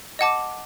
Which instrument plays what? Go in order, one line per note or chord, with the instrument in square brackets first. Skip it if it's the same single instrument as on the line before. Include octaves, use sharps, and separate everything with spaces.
[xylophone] D#5 F#5 A5 D6